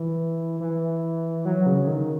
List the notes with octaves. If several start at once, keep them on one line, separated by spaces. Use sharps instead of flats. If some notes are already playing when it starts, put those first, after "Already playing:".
Already playing: E3
E3
F#3
C#3
D#3